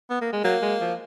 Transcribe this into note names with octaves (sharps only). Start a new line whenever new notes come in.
B3
A#3
G#3
F#3 A#3
G#3
F3